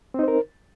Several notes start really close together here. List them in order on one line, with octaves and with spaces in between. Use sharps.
C4 D#4 C5 A#4